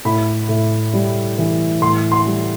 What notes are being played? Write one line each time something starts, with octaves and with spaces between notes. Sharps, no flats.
A2 B5
A2
G3
E3
A2 C6
C6
G3